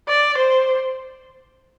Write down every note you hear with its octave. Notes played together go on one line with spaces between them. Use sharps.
D5
C5